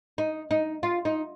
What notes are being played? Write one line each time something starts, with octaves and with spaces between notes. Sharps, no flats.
D#4
D#4
F4
D#4